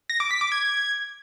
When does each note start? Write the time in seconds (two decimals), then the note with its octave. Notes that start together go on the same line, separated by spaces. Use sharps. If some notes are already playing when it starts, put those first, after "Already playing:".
0.10 A#6
0.20 D6
0.31 B6
0.41 D6
0.52 G#6